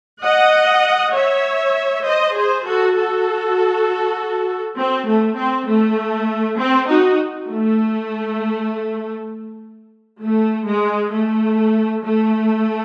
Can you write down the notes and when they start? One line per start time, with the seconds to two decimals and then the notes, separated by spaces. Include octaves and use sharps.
0.23 D#5 F#5
1.14 C#5 E5
2.05 C5 D#5
2.35 G#4 C5
2.65 F#4 A4
2.96 F#4 A4
4.77 C4
5.07 A3
5.38 C4
5.68 A3
6.59 C4
6.89 D#4 F#4
7.49 A3
10.22 A3
10.67 G#3
11.13 A3
12.04 A3